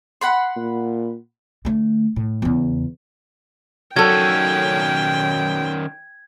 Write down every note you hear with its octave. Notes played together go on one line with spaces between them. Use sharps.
F#5 B5 C6
A#2
D3 A3
A2
E2 C#3
D#3 F#3 C#4 A4 G5 G#6